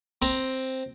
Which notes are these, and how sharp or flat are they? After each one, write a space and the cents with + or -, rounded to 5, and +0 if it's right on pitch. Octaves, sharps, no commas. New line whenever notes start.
C4 +0 A#5 +0